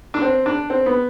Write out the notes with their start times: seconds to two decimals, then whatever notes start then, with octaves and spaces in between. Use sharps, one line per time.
0.14 D4
0.22 C4
0.46 D4
0.70 C4
0.86 B3